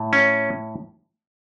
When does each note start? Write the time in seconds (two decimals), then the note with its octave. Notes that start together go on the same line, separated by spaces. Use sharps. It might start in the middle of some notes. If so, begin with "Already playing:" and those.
Already playing: A2
0.13 C#4